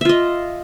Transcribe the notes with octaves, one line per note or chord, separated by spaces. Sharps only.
F4 D#5 E5